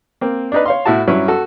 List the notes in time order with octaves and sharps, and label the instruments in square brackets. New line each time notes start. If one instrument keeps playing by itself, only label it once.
[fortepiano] A#3 C4
D4 D#4 B4
C#5 F5 C6
A2 E4 F#4 A5
G2 F#3 C#4 E4
F#4 A4